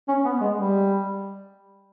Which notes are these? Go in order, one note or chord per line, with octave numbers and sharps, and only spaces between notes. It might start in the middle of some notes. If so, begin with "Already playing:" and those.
C#4
B3
G#3
G3